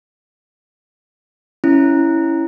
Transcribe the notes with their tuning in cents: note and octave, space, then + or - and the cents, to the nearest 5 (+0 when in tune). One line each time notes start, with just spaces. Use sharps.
C#4 +0 E4 +0